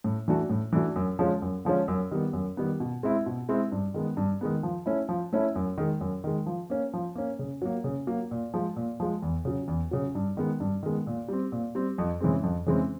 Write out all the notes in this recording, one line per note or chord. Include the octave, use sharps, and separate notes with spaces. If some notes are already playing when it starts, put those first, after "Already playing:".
A2
E3 A3 D4 F#4
A2
E3 A3 D4 F#4
F#2
D3 F3 G#3 C#4
F#2
D3 F3 G#3 C#4
F#2
D#3 G3 B3
F#2
D#3 G3 B3
B2
G#3 C4 E4
B2
G#3 C4 E4
G2
D#3 G#3 B3
G2
D#3 G#3 B3
F3
A3 C#4 E4
F3
A3 C#4 E4
F#2
D#3 G#3
F#2
D#3 G#3
F3
A#3 C#4
F3
A#3 C#4
C#3
F#3 A#3
C#3
F#3 A#3
A#2
F3 G#3
A#2
F3 G#3
E2
C#3 F#3
E2
C#3 F#3
G2
D#3 G#3 B3
G2
D#3 G#3 B3
A#2
G3 C4
A#2
G3 C4
F2
C#3 E3 G#3 C4
F2
C#3 E3 G#3 C4